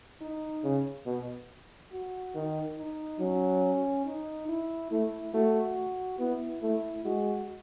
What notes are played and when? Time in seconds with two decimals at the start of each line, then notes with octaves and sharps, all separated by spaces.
0.21 D#4
0.64 C#3
1.06 B2
1.92 F#4
2.35 D#3
2.78 D#4
3.20 F#3 C#4
4.06 D#4
4.48 E4
4.91 A3 E4
5.34 A3 F#4
6.19 B3 E4
6.62 A3 E4
7.05 G#3 F#4